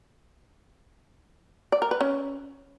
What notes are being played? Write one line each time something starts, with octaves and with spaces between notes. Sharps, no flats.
D5
A#4
B4
C#4